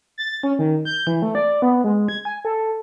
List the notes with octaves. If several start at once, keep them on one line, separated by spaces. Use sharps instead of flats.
A6
C#4
D#3
G6
E3
A3
D5
B3
G#3
G#6
G#5
A4